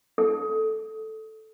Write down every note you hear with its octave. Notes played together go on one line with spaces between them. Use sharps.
A4